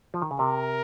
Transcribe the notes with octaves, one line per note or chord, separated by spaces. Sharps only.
F3
D#3
C#3
C3 A#4